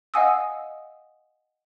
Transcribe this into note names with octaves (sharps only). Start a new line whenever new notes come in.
D#5 F5 F#5 G#5 D#6 E6